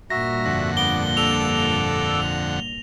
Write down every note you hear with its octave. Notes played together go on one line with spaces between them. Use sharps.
G2 A#2 F#4 E5 A#5 A#6
F2 D3 F#5
B3 D6 G7
A4 D6 E6 F7
F7